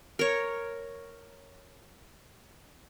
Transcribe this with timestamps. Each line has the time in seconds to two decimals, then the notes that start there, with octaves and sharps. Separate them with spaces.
0.19 A#4 C#5